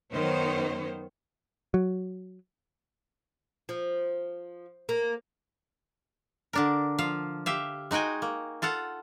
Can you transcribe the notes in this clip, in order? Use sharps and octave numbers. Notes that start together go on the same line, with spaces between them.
F#2 D#3 B3 C5 C#5
F#3
F3
A#3
D3 D4 A#4
F3 F5
G4 E5 F5
G#3 D#4 F#4 G5 G#5
A#3
F4 A4 F5 F#5